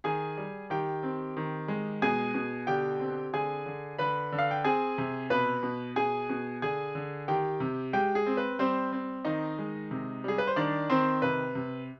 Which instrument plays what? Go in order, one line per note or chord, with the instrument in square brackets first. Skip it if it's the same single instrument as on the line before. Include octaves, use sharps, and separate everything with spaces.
[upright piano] D#3 G#4 G#5
G3
D#3 G4 G5
C4
D#3
G#3
B2 G#4 G#5
B2
D3 G4 G5
C4
D3 G#4 G#5
D3
D3 B4 B5
D3
F5
G5
C4 G#4 G#5
C3
B2 B4 B5
B2
B2 G#4 G#5
B2
D3 G#4 G#5
D3
D#3 G4 G5
C3
G#3 G4 G5
G#4
C4
B4
G3 C4 C5
C4
D#3 D#4 D#5
G#3
C3
G3 G#4
B4
C5
D#3 D4 D5
D#3 C4 C5
C3 B4
C3